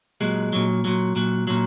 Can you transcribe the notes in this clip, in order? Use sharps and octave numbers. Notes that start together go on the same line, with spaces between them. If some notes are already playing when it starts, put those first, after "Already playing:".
A#2 F#3 G#3
A#2 F#3
A#2 F#3
A#2 F#3
A#2 F#3